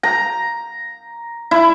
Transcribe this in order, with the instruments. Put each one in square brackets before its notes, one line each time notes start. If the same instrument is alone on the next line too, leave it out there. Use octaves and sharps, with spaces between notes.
[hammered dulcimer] A#5
E4